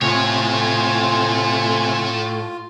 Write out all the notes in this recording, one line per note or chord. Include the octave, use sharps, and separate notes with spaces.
A2 C3 A3 F4 C#5 G#5